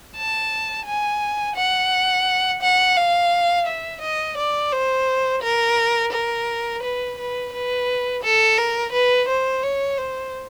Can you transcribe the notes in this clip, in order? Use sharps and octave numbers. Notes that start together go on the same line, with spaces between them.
A5
G#5
F#5
F#5
F5
E5
D#5
D5
C5
A#4
A#4
B4
B4
B4
A4
A#4
B4
C5
C#5
C5